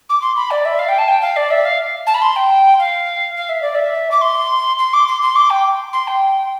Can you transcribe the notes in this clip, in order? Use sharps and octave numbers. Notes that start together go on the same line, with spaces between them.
D6
C6
B5
D5
E5
F5
G5
A5
G5
F5
D5
E5
F5
A5
B5
C6
G5
F5
F5
E5
D5
E5
D6
C6
C6
D6
C6
C6
D6
G5
C6
G5